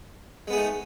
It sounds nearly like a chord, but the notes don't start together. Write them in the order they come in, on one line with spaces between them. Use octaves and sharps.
G#3 B3 G#4 A3 D#4